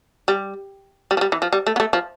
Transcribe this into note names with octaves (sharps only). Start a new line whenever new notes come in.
G3
G3
F3
G3
E3
F3
G3
A3
B3
A3
F3